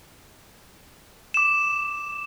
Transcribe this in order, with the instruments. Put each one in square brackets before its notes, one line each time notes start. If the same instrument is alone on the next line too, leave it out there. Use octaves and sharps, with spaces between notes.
[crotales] D6 E7